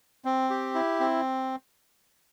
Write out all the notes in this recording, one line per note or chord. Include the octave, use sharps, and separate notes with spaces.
C4
G4
E4
C4